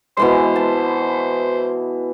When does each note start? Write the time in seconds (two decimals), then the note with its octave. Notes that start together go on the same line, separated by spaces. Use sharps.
0.17 B2 E3 G#3 C5
0.56 A5